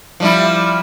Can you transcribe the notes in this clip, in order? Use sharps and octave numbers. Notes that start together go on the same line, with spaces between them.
F3 G3 E4